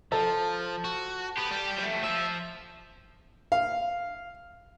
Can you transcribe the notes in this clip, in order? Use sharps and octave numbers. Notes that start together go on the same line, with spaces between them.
F3 A4
F#4
B3 G4
G3
F3 A3
F3 E5
F5